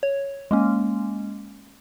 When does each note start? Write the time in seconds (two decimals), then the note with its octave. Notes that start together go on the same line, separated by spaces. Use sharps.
0.03 C#5
0.51 G#3 A#3 C#4